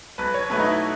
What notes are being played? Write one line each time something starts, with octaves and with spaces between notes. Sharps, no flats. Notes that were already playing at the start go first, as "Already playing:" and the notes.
B1 B4
C#5
B2 F#3 A3 B4
D#4
E4